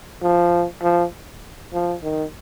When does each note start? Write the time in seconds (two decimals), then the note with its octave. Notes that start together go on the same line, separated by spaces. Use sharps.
0.23 F3
0.83 F3
1.74 F3
2.04 D#3